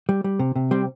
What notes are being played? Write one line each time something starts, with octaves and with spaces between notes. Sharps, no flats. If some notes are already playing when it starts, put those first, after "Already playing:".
G3
G3
C3
C3
G3 C4